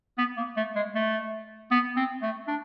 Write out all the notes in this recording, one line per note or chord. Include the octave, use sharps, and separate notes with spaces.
B3
A#3
A3
G#3
A3
B3
C4
A3
D4